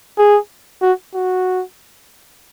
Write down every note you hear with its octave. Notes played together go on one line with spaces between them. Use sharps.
G#4
F#4
F#4